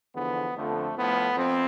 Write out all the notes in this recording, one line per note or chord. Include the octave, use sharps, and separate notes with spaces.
E2 D3 F3 B3
F2 D3 F3 A3
A2 F3 B3
F2 C4